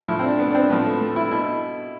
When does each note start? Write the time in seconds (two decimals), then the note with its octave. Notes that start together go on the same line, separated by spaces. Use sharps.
0.08 A2 F3 E4
0.19 C4
0.24 D4
0.39 B3
0.51 D4
0.55 C4
0.70 A2 F3 B3
0.85 A3
1.01 A3
1.16 E4
1.31 B2 E4